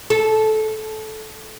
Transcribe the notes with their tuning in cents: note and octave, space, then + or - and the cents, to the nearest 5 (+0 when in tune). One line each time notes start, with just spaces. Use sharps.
A4 -15